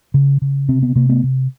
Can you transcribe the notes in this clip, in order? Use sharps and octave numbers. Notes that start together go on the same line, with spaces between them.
C#3
C#3
C3 C4
B3
C3 A#3
A3 B3
C3